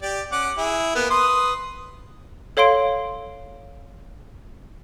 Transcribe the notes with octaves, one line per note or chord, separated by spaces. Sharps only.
G4 D5
C#4 F#5 D6
E4 G#4
A#3 B3
B4 C6 D#6
A4 C#5 F5 C6 D7